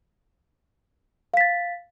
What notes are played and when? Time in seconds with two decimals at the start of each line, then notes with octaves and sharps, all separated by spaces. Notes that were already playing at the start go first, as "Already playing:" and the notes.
1.34 F5
1.37 B6
1.41 A6